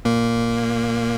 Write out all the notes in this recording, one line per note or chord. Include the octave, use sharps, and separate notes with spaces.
A#2 A#3